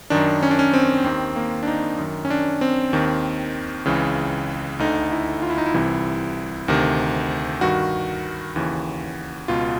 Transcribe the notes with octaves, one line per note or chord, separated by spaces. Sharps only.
F#2 D#3 D4
C#4
D4
C#4
C4
D#2 D#3 C4
A#3
D4
D#4
F#2 D#3
C#4
D4
C4
D#2 D#3
C#2 C#3 E3
D2 D3 D#4
E4
F4
E4
D#4
E4
C2 C3 E3
D2 C3 D#3
G2 D#3 F#4
D#2 C#3 E3
C#2 B2 F4